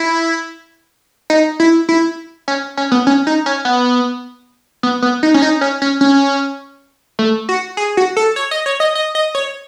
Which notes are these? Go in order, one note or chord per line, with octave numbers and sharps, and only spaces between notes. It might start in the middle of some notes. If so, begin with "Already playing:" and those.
Already playing: E4
D#4
E4
E4
C#4
C#4
B3
C#4
D#4
C#4
B3
B3
B3
D#4
C#4
D#4
C#4
C#4
C#4
A3
F#4
G#4
F#4
A4
C#5
D#5
C#5
D#5
D#5
D#5
C#5